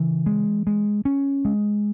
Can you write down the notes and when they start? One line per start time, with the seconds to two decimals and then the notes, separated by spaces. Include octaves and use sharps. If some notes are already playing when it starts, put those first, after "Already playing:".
Already playing: C#3 E3
0.26 G#3
0.67 G#3
1.05 C#4
1.45 G#3